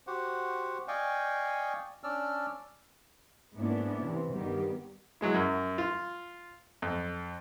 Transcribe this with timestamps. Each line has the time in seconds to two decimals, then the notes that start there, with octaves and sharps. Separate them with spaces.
0.07 F#4 G4 C5 F#5
0.88 D5 D#5 F5 G5 G#5 C#6
2.04 C#4 D4 D5 E6 F6
3.56 G#2 A#3 B3 C#4 D4 E4
4.02 C3 E3
4.33 G2 D#3 G3 B3 G4
5.21 F#3 G#3 E4
5.34 F#2
5.78 F4
6.82 F2